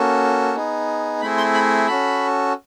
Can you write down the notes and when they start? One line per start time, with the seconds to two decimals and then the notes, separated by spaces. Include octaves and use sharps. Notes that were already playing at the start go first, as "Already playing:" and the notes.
Already playing: A#3 C#4 F#4 A4
0.56 B3 D#4 G#4
1.21 A3 C4 E4 G#4 B5
1.37 C6
1.54 B5
1.87 C#4 F#4 A4 B5